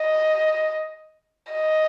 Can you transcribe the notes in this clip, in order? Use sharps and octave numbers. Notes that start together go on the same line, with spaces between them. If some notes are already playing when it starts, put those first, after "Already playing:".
Already playing: D#5
D#5